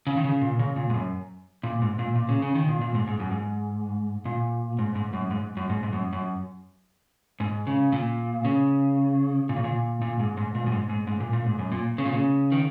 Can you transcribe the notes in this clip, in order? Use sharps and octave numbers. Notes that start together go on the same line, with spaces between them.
C#3
D#3
C#3
A#2
C#3
A#2
G#2
F#2
A#2
G#2
A#2
A#2
C#3
C#3
D#3
A#2
A#2
G#2
G#2
F#2
G#2
A#2
G#2
G#2
F#2
G#2
F#2
G#2
G#2
F#2
F#2
G#2
C#3
A#2
C#3
A#2
C#3
A#2
A#2
G#2
G#2
A#2
F#2
G#2
G#2
G#2
A#2
A#2
G#2
F#2
A#2
C#3
A#2
C#3
D#3